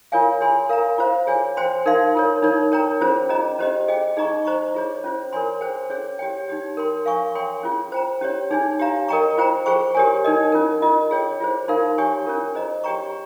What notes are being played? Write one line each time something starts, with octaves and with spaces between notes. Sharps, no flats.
F4 A#4 C#5 F5 G#5
G#4 C#5 G#5 C6
A#4 F5 A#5
F4 C5 F5
G#4 C#5 G#5
C5 G5 C6
D#4 A#4 F5 C6
F4 A#4 C#5
D#4 A#4 C#5
A#4 C#5 G5 A#5
C#4 F4 G#4 C5
C#4 G#4 D#5 A#5
C#4 G4 C5 D#5
G#4 D#5 G5
D#4 G#4 D#5 A#5 C#6
C5 D#5 A#5 C#6
F4 G#4 C#5
C#4 F4 C5
A#4 C#5 G#5 C6
G#4 C5 G5
C#4 G#4 C#5
G4 C#5 G5
D#4 G4 C#5
A#4 C#5 G5 C6
A#4 F5 G#5 C#6
A#4 C#5 G5 C6
C#4 F4 G#4
C5 G5 A#5
C#4 G4 C#5
D#4 G#4 C#5 G#5
G4 C#5 F5 A#5
A#4 D#5 G5 A#5 C#6
F4 C5 G5 A#5
G#4 C5 G5 C#6
G4 A#4 C#5 G#5
D#4 A#4 D#5
C#4 F4 A#4
F4 A#4 D#5
G#4 C#5 G5
F4 G#4 C5
D#4 A#4 F5 C6
G4 C#5 G#5 C#6
C#4 F4 A#4
G#4 C5 D#5 A#5
G4 C#5 G5 A#5 C#6